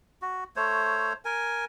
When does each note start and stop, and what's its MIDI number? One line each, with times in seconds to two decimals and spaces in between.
0.22 0.44 66
0.56 1.13 57
0.56 1.13 72
0.56 1.13 73
1.25 1.65 70
1.25 1.65 80